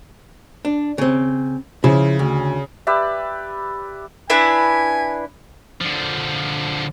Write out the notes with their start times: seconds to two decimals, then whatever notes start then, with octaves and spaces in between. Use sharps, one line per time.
0.65 D4
0.98 C#3 C4
1.84 C#3 F3 E4
2.19 D2
2.87 G4 B4 D5 E5
4.30 D4 E4 B4 G#5
5.81 D3 F3